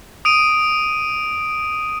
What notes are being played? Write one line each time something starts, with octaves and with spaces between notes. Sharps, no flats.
D#6 D7 D#7